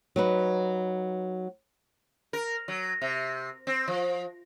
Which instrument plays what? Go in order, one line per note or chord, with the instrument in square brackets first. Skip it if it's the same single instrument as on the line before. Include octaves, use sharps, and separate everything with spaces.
[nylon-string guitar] F#3 D#4 B4
[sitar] A#4
F#3
C3
C4
F3